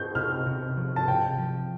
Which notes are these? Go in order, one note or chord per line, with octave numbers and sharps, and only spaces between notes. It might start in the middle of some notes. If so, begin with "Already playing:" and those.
Already playing: G6
C3 F6
C3
F3
A5
C3 G5
F3